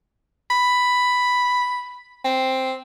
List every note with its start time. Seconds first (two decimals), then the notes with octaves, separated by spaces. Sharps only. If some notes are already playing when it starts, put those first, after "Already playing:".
0.51 B5
2.25 C4